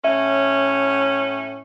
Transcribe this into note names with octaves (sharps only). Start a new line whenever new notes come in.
A2 C#4 E5